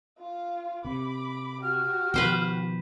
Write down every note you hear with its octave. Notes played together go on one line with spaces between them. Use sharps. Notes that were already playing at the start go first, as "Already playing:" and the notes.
F4 F5
C3 B5 D6
F#4 G4 F6
B2 D#3 F3 B4 C5 G5